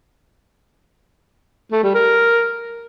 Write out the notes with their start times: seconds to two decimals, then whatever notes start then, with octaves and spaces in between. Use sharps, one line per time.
1.72 A3
1.83 G3
1.94 A#4